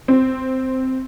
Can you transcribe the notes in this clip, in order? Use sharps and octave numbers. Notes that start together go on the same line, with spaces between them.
C4